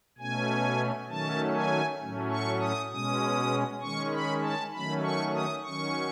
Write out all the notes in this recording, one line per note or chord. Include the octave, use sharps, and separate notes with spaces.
B2 A3 C#4 G#5
D#3 F#3 A3 C#4 A5
G#5
A2 F#3 A3 C#4
C#6
D#6
B2 G#3 C#4 D#6
D#3 G#3 C#4 C#6
B5
A5
D#3 F#3 A3 C#4 B5
C#6
D#6
D#3 F#3 C#4 C#6